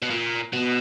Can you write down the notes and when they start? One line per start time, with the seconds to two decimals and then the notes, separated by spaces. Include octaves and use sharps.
0.02 B2
0.10 A#2
0.53 B2